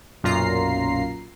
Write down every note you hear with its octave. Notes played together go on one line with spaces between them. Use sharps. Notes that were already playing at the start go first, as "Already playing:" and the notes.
B1 F#2 A#2 F4 A#5 C7